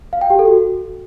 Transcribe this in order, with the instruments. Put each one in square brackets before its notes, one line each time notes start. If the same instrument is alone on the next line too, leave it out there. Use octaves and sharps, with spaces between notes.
[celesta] F5
G5
G4
A4
F#4